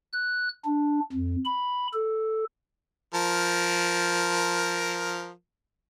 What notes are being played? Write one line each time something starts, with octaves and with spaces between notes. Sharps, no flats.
F#6
D4
F2
B5
A4
F3 A#4